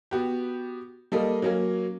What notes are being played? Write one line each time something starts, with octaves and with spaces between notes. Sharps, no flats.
B3 F#4 G4
G3 A#3 A4 D#5
F#3 A#3 C#4